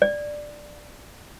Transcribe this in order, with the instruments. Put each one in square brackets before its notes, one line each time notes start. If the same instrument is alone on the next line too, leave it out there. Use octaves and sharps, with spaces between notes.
[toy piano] D5